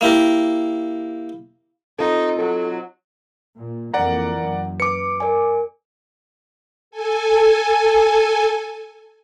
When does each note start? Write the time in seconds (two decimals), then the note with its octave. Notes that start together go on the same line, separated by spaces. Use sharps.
0.01 A#3 E4 G4 A#4
1.99 C4 D#4 F4 A4
2.39 F#3 A4
3.58 A#2
3.94 F2 E3 A#3 D5 F#5 A#5
4.40 F#2
4.80 B4 D6 C#7
5.20 A#4 D5 G#5
6.91 A4 G#5